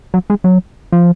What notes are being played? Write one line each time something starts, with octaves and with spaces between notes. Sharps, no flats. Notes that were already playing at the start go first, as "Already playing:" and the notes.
F#3
G#3
F#3
F3